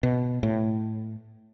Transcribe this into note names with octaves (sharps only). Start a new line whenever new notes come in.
B2
A2